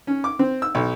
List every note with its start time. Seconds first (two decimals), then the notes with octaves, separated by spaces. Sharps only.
0.07 C#4
0.24 D6
0.39 C4
0.62 E6
0.75 B1